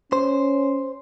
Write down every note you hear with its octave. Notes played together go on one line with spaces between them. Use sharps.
C#4 C5